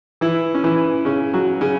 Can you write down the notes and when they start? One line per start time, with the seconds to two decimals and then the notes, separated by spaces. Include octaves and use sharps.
0.21 E3 E4
0.55 C#4
0.64 E3 E4
1.05 C#3 C#4
1.34 F#3 F#4
1.61 C#3 C#4